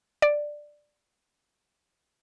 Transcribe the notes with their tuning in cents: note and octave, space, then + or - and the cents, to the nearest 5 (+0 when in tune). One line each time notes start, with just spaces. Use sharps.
D5 +10